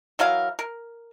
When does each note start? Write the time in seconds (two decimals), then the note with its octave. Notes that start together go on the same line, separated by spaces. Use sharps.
0.19 E3 F#3 A#4 F5
0.59 A#4